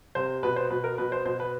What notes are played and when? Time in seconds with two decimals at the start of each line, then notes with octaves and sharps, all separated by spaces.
0.15 C3 C5
0.43 B2 B4
0.56 C5
0.70 B2 B4
0.84 A#4
0.98 B2 B4
1.12 C5
1.26 B2 C5
1.40 B4